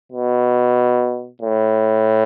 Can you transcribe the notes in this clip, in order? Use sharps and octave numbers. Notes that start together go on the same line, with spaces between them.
B2
A2